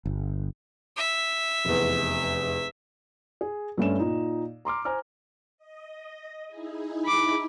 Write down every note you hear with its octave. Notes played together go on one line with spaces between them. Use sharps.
G1
E5
F1 E2
G#4
G2 A3 C#4 E7
A#2 D#4
A#5 C6 D6 F6
C5 G#5 A#5 F6
D#5
D#4 E4 G#4
B5 D6